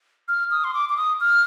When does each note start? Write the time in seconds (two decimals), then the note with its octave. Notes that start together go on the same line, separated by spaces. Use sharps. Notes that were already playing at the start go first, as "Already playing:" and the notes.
0.28 F6
0.51 D#6
0.64 C6
0.74 D6
0.89 D6
0.97 D#6
1.21 F6